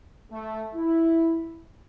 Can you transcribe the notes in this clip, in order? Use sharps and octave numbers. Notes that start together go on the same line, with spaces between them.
A3
E4